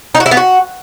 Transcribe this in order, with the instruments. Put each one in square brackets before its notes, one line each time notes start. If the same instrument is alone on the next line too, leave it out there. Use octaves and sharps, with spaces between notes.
[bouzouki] D#4
F#4
E4
B3
F#4